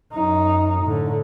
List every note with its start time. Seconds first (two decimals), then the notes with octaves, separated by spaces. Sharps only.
0.14 F#2 D#4
0.83 A2 D3